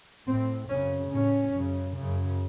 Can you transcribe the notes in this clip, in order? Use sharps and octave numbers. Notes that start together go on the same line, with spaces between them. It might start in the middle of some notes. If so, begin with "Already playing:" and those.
A2 C4
F#2 C#3 C#4
A2 C#4
F#2 C#3
F#2 C#3